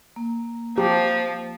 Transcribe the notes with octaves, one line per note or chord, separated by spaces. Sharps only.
A#3
F3 G4